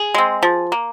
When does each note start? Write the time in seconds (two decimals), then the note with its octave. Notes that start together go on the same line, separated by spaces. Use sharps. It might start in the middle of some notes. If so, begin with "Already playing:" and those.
Already playing: G#4
0.14 G#3 C4
0.43 F3
0.72 A#3